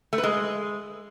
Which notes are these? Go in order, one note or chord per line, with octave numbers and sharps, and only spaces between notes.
A3
B4
G#3